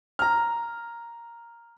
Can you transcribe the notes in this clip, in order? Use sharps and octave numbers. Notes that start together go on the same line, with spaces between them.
A#5 F6